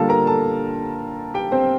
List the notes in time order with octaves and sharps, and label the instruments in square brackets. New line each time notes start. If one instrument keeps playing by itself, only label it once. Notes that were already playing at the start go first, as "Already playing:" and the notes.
Already playing: [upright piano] D3 G3 A#3 F4 A4 F5 A5
A#4 A#5
A4 A5
G4 G5
C4 C5